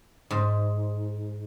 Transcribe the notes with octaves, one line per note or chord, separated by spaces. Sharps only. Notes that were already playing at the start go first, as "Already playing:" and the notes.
G#2